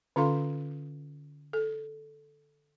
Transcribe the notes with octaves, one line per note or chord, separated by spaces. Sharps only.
D3 C#4 F4 A4 F5 C6
A4